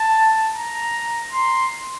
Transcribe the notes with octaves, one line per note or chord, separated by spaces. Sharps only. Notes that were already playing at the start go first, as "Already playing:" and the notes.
Already playing: A5
A#5
C6